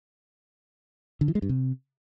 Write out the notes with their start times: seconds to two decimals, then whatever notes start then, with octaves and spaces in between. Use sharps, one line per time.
1.21 D3
1.28 E3
1.35 G#3
1.42 G2
1.49 C3